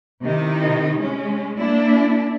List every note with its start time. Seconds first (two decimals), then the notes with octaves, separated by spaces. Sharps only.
0.22 C3 D#3 D#4 E4
0.99 G#3 C#4
1.58 A#3 D4 E4